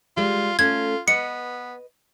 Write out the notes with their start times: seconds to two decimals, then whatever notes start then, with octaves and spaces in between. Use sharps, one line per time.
0.17 G3 G#3 F4
0.59 A3 C#4 F4 G#6
1.08 B3 B4 D#5 C#7